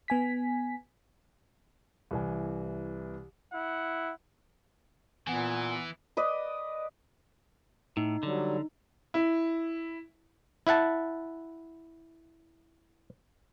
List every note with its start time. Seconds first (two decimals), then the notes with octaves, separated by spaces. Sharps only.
0.08 B3 G#5 B6
2.11 C2 E3 G#5
3.52 E4 F#5
5.27 A#2 E3 B3 F#5 G#5
6.17 B4 D5 D#5
7.97 A2 D#4
8.23 D3 F#3 G3
9.14 E4
10.67 E4 E5 F#5 A5